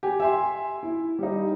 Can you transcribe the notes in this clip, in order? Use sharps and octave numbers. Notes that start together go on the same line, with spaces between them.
G4 G#5
E5 G#5 C6
E4
G3 D#4